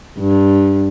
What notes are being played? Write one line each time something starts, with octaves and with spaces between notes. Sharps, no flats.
G2